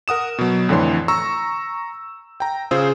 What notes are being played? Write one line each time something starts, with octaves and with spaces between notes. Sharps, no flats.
A#4 F#5 D#6 E7
B2 F#3
F2 A2 D3 E3 C#5 C6
A#5 C#6 E6
G5 A#5
C#3 F4 G#4 C5 E6